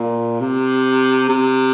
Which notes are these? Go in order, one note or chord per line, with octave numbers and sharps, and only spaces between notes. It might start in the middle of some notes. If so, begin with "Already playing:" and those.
Already playing: A#2
C3
C3